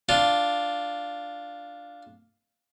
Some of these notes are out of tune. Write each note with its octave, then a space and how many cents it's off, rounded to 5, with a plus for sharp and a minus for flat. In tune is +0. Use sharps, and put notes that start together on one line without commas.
D4 +0 F4 +0